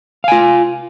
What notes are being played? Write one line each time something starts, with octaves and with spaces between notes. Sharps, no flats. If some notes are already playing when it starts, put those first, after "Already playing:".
F4 F5 G#5